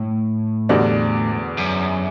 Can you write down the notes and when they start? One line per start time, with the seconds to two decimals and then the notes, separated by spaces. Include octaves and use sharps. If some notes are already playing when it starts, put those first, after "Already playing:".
Already playing: A2
0.69 E2 D3 G3 D4 F#4
1.57 F#2